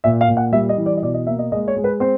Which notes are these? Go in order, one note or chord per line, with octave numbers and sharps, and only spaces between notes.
A#2 E5
F5
A#2
F#5
G3 E5
D#5
E3
D5
D#5
B2 D5
D#5
A#3 E5
D#5
G#3 D#5
C#5
G#3
B4
C4 C5